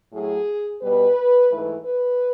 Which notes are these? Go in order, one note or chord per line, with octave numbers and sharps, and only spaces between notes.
A2 F#3 A3 G#4
B2 G3 B4
G#2 E3 A3
B4